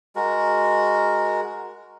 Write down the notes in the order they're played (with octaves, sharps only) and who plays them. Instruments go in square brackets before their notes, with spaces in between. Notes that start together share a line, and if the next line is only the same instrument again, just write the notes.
[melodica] G#3 F#4 A#4